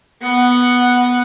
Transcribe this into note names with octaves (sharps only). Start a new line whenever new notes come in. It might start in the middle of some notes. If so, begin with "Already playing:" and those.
B3 F#5